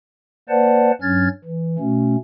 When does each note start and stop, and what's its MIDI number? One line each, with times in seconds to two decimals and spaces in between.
0.49 0.91 58
0.49 0.91 71
0.49 0.91 72
0.49 0.91 74
0.49 0.91 78
0.49 0.91 81
1.02 1.28 43
1.02 1.28 54
1.02 1.28 61
1.02 1.28 89
1.02 1.28 92
1.02 1.28 93
1.44 1.76 52
1.79 2.16 47
1.79 2.16 57
1.79 2.16 61